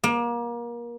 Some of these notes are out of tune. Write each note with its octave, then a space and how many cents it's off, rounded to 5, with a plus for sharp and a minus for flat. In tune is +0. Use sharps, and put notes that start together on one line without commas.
A#3 +30